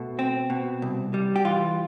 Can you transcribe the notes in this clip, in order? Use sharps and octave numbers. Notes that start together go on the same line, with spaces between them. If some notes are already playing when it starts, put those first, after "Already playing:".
Already playing: B2 A3
C4
B2
C2
G3
G4
E3 F4